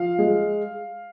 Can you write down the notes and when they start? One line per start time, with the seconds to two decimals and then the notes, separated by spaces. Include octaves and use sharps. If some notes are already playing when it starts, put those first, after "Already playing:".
Already playing: F3 F5
0.19 G#3